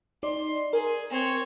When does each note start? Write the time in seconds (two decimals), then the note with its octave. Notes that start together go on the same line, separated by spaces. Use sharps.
0.23 D#4 D5 C6
0.73 G#4 A#4
1.10 C4 C#5